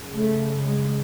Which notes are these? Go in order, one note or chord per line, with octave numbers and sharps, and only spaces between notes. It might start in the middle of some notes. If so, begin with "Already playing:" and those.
Already playing: F#2 C#3
A3
G#3